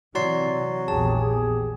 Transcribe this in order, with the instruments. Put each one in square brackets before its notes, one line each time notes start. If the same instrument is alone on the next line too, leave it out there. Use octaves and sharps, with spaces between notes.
[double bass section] C3 E3 [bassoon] F#3 [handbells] D5 C6 C7
[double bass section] A#1 E2 [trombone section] G4 G#4 [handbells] A5